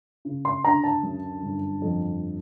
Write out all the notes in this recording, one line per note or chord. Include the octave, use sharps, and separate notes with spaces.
C#3
C6
D2 A#5
A5
F#2
G1
F2